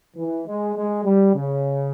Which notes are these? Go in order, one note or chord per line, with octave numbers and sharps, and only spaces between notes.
E3
G#3
G#3
G3
C#3